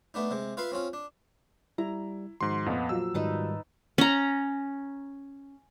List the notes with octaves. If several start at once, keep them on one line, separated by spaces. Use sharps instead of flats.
A3 B3 D4 D#4
C3 G#3
F4 B4 E5 F5 C6
C4 C#4 F4
D4
G3 E4 A#5
G#2 D#3 F3 F#4 C6
A#1 F2 B3 D#5 F5 F#5
A#2 F3 F#3 E6
G#2 D#3 G3 D#4 B4 A5
C#4 A#5